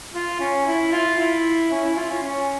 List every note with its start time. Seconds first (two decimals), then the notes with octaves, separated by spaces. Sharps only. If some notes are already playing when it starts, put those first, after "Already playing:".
0.13 F4
0.40 C#4
0.66 E4
0.92 F4
1.19 E4
1.71 C#4
1.84 E4
1.97 F4
2.10 C#4
2.22 C#4